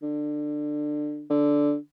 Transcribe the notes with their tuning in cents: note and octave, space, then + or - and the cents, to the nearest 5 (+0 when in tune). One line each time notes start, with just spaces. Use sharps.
D3 +20
D3 -5